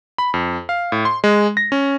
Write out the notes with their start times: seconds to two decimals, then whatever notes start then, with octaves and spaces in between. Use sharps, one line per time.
0.18 B5
0.34 F2
0.69 F5
0.92 A2
1.05 C6
1.24 G#3
1.57 A#6
1.72 C#4